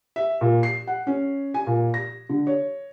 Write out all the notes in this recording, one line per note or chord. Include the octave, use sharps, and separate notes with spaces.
E5
A#2
C7
F#5
C#4
G#5
A#2
A#6
D3
C#5